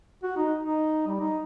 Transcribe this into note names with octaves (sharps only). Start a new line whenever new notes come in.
F#4
D#4
D#4
G3
D#4